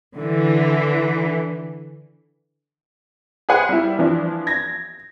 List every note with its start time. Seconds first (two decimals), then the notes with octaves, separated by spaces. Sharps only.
0.17 D3 E3
3.49 G#4 B4 C5 F#5 G#5
3.69 G3 E4
3.99 E3 F3 D4
4.47 G#6 A#6